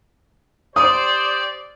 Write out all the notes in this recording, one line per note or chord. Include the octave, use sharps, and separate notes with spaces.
G4 C5 D5 D#6